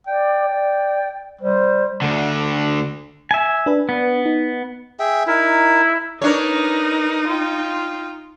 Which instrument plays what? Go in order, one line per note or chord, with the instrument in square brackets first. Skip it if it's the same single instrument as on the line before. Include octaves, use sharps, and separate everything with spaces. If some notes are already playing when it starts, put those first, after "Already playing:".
[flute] D5 [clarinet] G5
[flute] D5
[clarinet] G3 [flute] C5
[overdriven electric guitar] D2 D3
[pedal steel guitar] E5 G#5
[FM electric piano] D4 B4
[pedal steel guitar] B3
[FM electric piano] D#4
[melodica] G#4 E5 G5
[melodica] D#4 A#4 [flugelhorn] E4
[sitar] D4 C#5 [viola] D#4 [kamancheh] A#4 B4
[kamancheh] F4 G5